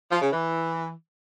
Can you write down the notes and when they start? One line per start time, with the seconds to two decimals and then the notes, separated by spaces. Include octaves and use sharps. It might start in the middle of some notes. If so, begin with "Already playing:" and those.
0.11 F3
0.22 C#3
0.32 E3